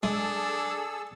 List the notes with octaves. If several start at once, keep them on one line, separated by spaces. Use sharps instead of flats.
G#3 D4 G#4 A4 E6